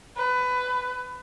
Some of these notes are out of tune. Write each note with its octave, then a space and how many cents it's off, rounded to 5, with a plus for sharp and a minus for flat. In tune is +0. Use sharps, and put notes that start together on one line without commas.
B4 +20